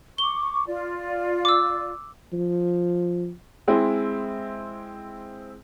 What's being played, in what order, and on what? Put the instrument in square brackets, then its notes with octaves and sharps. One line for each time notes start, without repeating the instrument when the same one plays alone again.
[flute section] C#6 D6 [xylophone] G7
[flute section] F4 D5
[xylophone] D6 E6
[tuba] F3
[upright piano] G#3 C4 E4